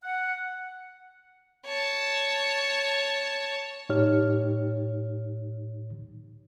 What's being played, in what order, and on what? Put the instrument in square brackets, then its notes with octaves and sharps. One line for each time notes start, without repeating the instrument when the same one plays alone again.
[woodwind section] F#5
[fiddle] C#5 A5
[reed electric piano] A2 D#4 G4 C#5 F6